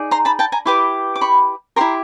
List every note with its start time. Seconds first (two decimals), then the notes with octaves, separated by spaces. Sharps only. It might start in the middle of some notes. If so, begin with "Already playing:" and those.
Already playing: D#4 G#4 D5
0.11 A#5 C6
0.25 A5 B5
0.39 G5 A5
0.52 G#5 A#5
0.65 E4 G4 B4 C6 D6
1.16 D6
1.21 B5 C#6
1.76 E4 G4 A#4 A#5 C6